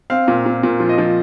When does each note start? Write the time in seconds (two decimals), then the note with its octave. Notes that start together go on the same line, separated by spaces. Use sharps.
0.10 C4 F5
0.28 A#2
0.46 A#2
0.63 A#2
0.80 F3
0.89 D#5
0.98 F3